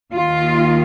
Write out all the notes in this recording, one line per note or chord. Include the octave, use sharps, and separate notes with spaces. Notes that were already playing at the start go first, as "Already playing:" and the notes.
D#2 D#3 F4